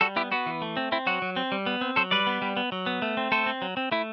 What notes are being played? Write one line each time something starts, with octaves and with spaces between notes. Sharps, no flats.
G3 F#4 A4
B3 E4 G4
B3 F#4
E3
A3
C4
C4 E4
F#3 F#4
F#3
C4
G3
B3
C4
F#3 A4 C5
G3 B4 D5
B3
G3
B3
F#3
B3
A3
C4
A3 A4 C5
C4
F#3
C4
A3 E4